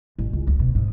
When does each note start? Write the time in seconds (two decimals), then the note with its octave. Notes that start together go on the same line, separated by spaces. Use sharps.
0.19 A1
0.33 C#2
0.47 D2
0.59 B2
0.75 G#2